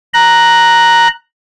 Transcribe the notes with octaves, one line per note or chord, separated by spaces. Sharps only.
A#5 F#6